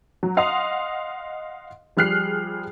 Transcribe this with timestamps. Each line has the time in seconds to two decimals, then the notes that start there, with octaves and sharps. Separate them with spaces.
0.23 F#3
0.37 D#5 F5 F#5 C6 D#6
1.97 F3 G3 G#4 F6 F#6 C7